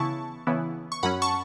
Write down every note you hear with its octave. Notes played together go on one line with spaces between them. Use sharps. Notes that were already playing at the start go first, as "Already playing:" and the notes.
Already playing: C#3 E3 B3 E4 A5 C#6
C#3 E3 B3 E4
C#6
F#2 F#3 C#4 F#5 B5
A5 C#6